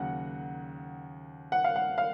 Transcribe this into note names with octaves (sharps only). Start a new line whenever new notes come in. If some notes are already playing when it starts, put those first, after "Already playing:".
Already playing: D#2 C#3 F#3 F#5
F#5
F5
F#5
F5